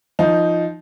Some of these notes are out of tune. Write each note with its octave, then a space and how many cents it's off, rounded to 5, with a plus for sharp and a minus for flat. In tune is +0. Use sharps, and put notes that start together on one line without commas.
F3 -15 D#4 +0